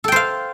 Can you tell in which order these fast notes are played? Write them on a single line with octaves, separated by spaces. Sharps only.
A4 G5 C5 F5